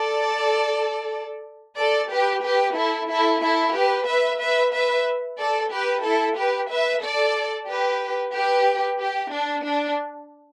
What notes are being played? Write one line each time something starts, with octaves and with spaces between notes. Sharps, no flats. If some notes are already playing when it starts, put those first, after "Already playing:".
Already playing: A4 D5
A4 D5
G4 B4
G4 B4
E4 A4
E4 A4
E4 A4
G4 B4
B4 E5
B4 E5
B4 E5
A4 D5
G4 B4
E4 A4
G4 B4
B4 E5
A4 D5
G4 B4
G4 B4
G4
D4
D4